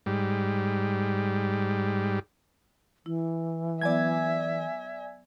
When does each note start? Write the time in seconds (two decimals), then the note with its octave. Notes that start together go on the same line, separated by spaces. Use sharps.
0.06 G#2 G3
3.06 E3 E4
3.81 F#3 B3 D5 E5 G#5 G#6